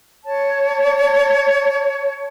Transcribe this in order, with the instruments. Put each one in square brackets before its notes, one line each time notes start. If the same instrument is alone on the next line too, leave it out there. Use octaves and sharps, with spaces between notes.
[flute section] C#5 A5